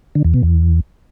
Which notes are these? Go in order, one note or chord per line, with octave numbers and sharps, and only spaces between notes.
D3
E2
B2
E2